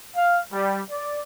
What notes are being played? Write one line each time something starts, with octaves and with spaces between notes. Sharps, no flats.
F5
G3
D5